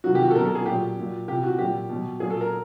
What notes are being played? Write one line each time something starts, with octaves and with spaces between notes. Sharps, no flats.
C3 D#3 F#3 F#4
G4
F#4
A4
B2 F#3 A#4
A4
G#4
A#2 F#3 G4
A#2 F#3
C3 E3 G4
F#4
A#2 F#3 G4
B2 F#3
A#2 F#3 G#4
A4
A#4